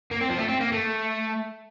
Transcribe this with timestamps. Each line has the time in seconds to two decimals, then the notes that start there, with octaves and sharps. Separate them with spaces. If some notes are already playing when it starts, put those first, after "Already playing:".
0.11 A#3
0.21 C4
0.30 F3
0.38 A3
0.48 C4
0.60 A#3
0.72 A3